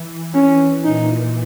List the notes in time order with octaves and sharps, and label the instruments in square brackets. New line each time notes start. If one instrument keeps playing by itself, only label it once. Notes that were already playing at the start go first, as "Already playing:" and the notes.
Already playing: [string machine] E3
[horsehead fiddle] C#4
[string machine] A#2 [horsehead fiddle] D#4